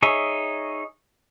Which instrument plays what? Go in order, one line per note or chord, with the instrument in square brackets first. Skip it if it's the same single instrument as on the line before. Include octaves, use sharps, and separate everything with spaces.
[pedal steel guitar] D#4 G#4 C#5 D#5 E5